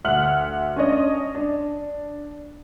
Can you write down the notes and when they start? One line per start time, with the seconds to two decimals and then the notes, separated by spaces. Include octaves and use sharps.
0.04 D2 E5 F#5 F6 F#6 F#7
0.76 C#4 D4 C#5 D#5
1.35 D4